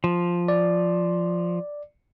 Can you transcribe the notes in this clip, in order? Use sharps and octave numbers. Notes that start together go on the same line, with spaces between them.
F3
D5